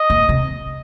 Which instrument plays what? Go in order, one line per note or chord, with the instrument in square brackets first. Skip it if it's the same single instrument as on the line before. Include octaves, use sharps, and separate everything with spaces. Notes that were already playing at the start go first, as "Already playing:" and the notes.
Already playing: [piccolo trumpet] D#5
[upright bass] A#2
C3